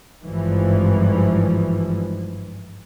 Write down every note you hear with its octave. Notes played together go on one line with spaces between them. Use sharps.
G#1 G2 E3 F3